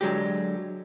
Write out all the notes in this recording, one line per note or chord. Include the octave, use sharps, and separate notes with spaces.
D3 F#3 G#3 G4